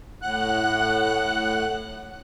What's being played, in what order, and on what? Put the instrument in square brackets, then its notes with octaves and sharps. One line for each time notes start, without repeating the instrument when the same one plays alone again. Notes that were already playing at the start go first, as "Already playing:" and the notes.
[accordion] A2 F#5 F#6